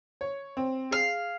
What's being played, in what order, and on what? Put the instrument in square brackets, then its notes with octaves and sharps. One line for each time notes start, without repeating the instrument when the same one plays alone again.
[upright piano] C#5
C4
[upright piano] G#4 [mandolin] F5